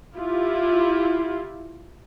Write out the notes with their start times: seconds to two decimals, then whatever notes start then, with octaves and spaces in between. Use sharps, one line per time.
0.15 E4 F4 G4